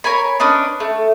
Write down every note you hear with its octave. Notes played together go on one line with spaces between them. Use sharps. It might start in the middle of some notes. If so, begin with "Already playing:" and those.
A#4 C#5 G#5 B5
C#4 D4 B4 D#5
A3